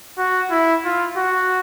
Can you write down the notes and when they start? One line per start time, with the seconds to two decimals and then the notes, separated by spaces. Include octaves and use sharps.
0.18 F#4
0.51 E4
0.85 F4
1.17 F#4